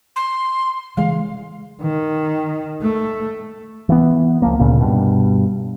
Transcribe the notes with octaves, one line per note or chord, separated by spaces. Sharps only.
C6
C#3 E3 G#3 F5
D#3
A3
E3 B3
C#2 F3 A#3
D2 A#2 C#3
G2 B2